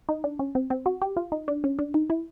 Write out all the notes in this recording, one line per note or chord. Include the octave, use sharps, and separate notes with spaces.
D#4
D4
C#4
C4
C4
F#4
G4
F4
D#4
D4
C#4
D4
D#4
E4